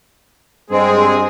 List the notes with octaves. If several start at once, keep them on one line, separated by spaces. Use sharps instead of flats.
G2 G#3 C4 G#4